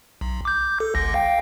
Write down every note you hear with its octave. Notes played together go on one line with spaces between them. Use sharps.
B1
D6 G6
A4
G1 C#2 A#6
F5 G5